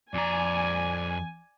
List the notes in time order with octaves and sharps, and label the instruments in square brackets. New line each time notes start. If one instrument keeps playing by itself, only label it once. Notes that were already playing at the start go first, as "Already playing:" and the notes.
[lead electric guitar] F2 A#5 [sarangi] D5 [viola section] G#5